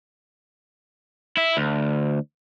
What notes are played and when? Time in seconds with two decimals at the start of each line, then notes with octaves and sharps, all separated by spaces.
1.37 E4 E5
1.57 D2